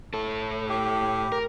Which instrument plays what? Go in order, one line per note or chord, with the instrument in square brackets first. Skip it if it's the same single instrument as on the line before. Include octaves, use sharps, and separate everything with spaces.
[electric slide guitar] A2 A4
[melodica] G4
[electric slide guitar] A#4